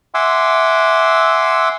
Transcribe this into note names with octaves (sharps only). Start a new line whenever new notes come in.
E5 F#5 G#5 C6 D6 E6